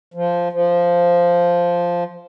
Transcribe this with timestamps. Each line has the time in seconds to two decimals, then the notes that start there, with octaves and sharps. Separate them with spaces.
0.14 F3
0.52 F3